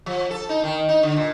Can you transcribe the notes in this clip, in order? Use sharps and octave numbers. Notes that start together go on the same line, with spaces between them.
F3
A4
D#4
D#3
D#4
D3
A#2